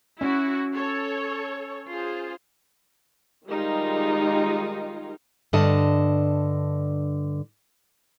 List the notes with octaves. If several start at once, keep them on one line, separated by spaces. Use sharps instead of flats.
C#4 E4 F#4
A4 C#5
F4 G#4 C5
D#3 G3 G#3 D#4 F4
G2 D3 D#5 A5